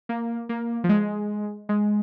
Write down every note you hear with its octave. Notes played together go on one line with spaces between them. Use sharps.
A#3
A#3
F3
G#3
G#3